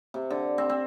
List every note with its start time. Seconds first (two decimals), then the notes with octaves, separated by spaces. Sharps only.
0.14 C3
0.30 D3
0.58 C4
0.69 C4